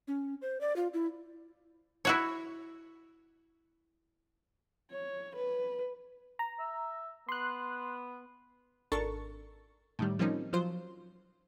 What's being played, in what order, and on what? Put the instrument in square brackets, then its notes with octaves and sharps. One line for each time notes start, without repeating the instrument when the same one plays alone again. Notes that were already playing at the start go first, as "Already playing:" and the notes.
[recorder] C#4
C5
D5
F4
E4
[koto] E4 F#4 C#5
[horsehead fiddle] C#5
B4
[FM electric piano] A#5
[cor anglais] E5
[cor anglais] B3 [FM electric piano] C6 F#6
[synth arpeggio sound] G#1 D4 A4 A#4 C#6 A6
A2 D#3 G3
F3 G3 A#3 C4 C#4 D#4
F3 F#3 F4 C5